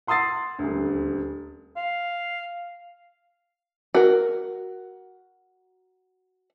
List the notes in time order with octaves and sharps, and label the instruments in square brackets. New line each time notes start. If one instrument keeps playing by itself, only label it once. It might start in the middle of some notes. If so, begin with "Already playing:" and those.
[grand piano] F#5 C6 D#6 E6 A6 C7
D#1 D2
[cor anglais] F5
[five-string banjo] F#4 A#4